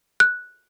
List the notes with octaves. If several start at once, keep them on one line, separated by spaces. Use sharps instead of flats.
F#6